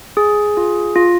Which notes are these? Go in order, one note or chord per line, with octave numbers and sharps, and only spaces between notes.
G#4
F4
F4